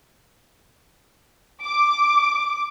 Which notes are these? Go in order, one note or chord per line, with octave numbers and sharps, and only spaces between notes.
D6